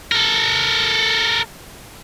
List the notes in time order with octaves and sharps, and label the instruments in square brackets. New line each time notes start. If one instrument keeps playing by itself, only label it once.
[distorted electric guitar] A4 A#4